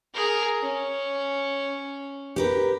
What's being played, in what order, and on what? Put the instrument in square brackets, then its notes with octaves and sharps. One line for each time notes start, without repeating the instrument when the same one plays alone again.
[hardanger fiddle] G#4 A#4
C#4
[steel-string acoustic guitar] G4 A#4 B4